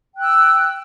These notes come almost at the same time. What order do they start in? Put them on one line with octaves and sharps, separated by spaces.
G5 F#6 E6